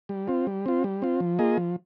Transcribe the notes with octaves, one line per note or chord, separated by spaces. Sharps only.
G3
C4 F4
G3
C4 F4
G3
C4 F4
F3
A#3 F4 G#4 D#5
F3